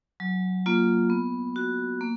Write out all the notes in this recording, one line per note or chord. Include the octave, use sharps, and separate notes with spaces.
F#3
A#3 F4
B3
F#4
A#3